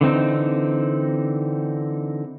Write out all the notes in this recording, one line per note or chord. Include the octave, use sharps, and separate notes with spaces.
D3 E3 C4 D#4